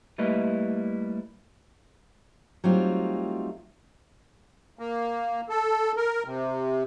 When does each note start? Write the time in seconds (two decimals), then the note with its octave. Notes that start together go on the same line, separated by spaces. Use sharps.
0.18 G3 A3 A#3 E4 B4 D#5
2.64 F#3 G3 A3 C4 D#4 F4
4.79 A#3
5.49 A4
5.97 A#4
6.25 C3